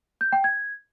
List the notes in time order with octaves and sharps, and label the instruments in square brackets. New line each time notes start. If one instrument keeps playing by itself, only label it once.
[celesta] G6
G5
G#6